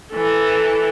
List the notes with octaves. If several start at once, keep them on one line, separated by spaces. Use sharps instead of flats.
E3 A4